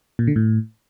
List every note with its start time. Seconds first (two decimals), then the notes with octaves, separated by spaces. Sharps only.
0.19 A#2
0.27 D3
0.36 A2